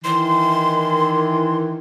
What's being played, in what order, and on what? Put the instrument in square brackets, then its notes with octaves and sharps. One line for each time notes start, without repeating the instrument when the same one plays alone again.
[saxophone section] D#3 E3 [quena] C6